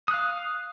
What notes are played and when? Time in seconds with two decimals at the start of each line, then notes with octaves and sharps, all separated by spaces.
0.08 D#6
0.11 F#6
0.14 F5